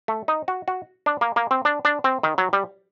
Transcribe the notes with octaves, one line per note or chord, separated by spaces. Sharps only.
A3
D#4
F#4
F#4
D4
A#3
A#3
C4
D4
D4
C4
D#3
F#3
G3